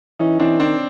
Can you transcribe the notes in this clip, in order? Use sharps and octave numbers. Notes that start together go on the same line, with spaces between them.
E3 C#4 D#4
E3 C4 D4
D#3 C4 D4